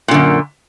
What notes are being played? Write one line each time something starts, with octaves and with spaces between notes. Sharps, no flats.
F#2 A#2 D3